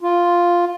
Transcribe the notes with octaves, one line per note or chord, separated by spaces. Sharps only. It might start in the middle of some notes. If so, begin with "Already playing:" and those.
F4